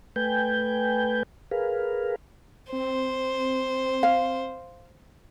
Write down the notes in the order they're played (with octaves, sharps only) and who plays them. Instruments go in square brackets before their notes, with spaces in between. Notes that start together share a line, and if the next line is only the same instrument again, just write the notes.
[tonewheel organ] A3 B4 G5 G#5 G6
G#4 A#4 B4 F5
[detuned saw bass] C4 [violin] C5
[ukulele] F5